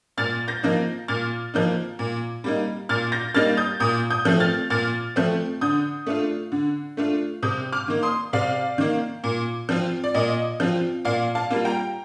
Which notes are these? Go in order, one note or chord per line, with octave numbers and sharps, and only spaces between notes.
A#2 F6 A6
G6 A#6
F3 A#3 D#4
A#2 F6 A6
F3 A#3 D#4
A#2
G3 A#3 D#4
A#2 F6 A6
G6 A#6
G3 A#3 D#4 F6 A6
D#6 G6
A#2 D#6 G6
D#6 G6
F3 A3 C4
F6 A6
A#2 F6 A6
F3 A3 C4
D3 D#6 G6
A3 D4 F4
D3
A3 D4 F4
C3 D#6 G6
D6 F6
D#3 A#3
C6 D#6
C3 D5 F5
D#3 A#3
A#2
F3 C4 F4
D5
A#2 D#5
F3 C4 F4
A#2 D5 F5
F5 A5
G3 A#3 F4
G5 A#5